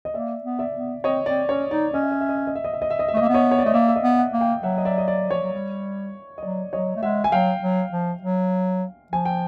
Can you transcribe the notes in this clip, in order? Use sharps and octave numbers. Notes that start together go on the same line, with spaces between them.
D#5
A#3 D5 E5
B3
D5 E5
B3
C4 C#5 D#5
C4 D5
C#4 C#5
D#4 D5
C#4 D#5
E5
D#5
E5
D#5
E5
D#5
E5
D#5
E5
D#5
E5
D#5
E5
A3
D#5
A#3
E5
B3
C#5 D#5
C#5
D5
A3 D#5
A#3 D5 E5
E5
D#5 F5
B3
E5 F#5
A#3
F5 G5
F#3 E5 F#5
D#5
D5 E5
D#5
D5
F3 C#5
F#3
G3
D#5
F#3 D5
F#3 C#5 D#5
A3
G#3 E5 F#5
G#5
F#3 F5 G5
F#3
F3
F#3
F3 G#5
G5